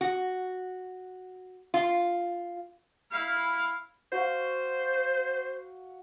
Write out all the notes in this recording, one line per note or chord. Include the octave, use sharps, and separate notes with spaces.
F#4
F4
E4 F5
F#4 C5 F5